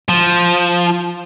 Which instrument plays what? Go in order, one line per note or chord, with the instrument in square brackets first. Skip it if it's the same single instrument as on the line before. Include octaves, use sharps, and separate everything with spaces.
[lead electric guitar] F3